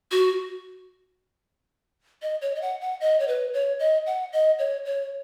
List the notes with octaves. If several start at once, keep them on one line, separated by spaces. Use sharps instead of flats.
F#4
D#5
C#5
D#5
F#5
F#5
D#5
C#5
B4
C#5
D#5
F#5
D#5
C#5
C#5